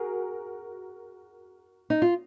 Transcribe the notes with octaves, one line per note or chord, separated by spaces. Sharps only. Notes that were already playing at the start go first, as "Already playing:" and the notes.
Already playing: F#4 G#4 A#4
D#4
F4